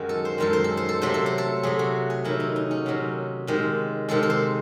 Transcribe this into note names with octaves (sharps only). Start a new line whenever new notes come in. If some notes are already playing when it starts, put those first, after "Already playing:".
Already playing: F#2 D#3 G#3 F#4
A4
C5
F#2 D#3 G#3 A4
C5
A4
C5
A4
C3 F#3 A3 C5
A4
C5
A4
C3 F#3 A3 G#4
F#4
G#4
C3 D#3 F#3 E4
D#4
D#4
C#4
C3 D#3 F#3
C3 D#3 G#3
C3 D#3 G#3 A4
A4
C5